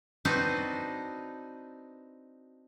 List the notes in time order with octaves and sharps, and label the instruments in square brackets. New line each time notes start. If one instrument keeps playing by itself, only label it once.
[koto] C4 D4 D#4 F#4 B4 C5